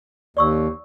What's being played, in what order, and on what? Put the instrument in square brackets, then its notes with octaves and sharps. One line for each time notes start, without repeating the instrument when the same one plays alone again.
[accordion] D#2 [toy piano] D5 C#6 E6